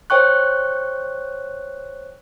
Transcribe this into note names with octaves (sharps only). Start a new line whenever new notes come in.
C5 C#5 G5 C#6 F#6